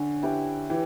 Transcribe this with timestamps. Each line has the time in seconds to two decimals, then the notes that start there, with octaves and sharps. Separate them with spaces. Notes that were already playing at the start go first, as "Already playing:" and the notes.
Already playing: D3 C#4
0.23 E4 G4 B4
0.70 E3 G4